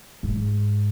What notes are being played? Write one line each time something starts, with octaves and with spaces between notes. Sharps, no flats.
G#2